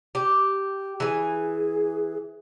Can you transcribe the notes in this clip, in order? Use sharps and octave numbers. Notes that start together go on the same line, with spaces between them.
G4
E3 G#4 G#5